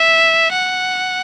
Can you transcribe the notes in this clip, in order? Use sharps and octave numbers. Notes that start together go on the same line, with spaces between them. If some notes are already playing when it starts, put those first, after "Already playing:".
Already playing: E5
F#5